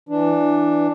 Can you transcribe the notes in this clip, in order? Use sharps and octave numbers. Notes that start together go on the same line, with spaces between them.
E3 D4